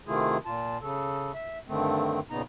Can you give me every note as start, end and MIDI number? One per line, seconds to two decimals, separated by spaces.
0.07 0.37 48
0.07 0.37 51
0.07 0.37 57
0.07 0.37 64
0.07 0.37 65
0.07 0.37 68
0.45 0.78 46
0.45 0.78 65
0.45 0.78 81
0.81 1.32 49
0.81 1.32 69
1.34 1.58 76
1.68 2.20 43
1.68 2.20 50
1.68 2.20 51
1.68 2.20 57
1.68 2.20 60
2.30 2.42 46
2.30 2.42 49
2.30 2.42 59
2.30 2.42 63
2.30 2.42 82